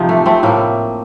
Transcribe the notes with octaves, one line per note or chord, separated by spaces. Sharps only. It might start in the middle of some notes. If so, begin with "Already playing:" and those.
Already playing: C3 F3 D#4 G4
A3
A3 C4
A2 A3 A#3